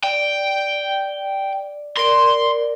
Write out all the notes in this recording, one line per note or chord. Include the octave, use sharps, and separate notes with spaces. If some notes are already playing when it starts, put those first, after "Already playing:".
D5 G5
A#4 D5 C6